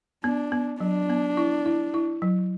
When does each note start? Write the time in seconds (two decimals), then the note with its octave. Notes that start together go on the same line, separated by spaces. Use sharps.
0.24 B3 D4
0.52 B3
0.80 F#3 D4
1.09 B3
1.37 E4
1.66 E4
1.94 E4
2.22 F#3